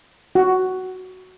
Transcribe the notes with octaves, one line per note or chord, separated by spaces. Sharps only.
F#4